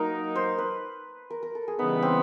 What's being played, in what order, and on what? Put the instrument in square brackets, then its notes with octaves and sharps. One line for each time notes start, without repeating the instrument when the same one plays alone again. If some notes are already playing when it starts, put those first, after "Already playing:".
Already playing: [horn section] F#3 A#3 D#4 [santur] A#4
[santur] C5
B4
A#4
A#4
A4
G#4
[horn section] C#3 E3 G3 B3 [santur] D#4
[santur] C4